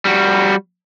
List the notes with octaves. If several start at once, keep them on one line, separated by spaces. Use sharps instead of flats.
G3 F#4